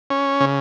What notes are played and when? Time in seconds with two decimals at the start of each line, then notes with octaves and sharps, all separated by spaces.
0.10 C#4
0.41 C#3